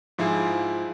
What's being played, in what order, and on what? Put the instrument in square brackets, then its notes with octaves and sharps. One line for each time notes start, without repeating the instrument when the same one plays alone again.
[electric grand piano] G#2 F3 E4 F4 G#4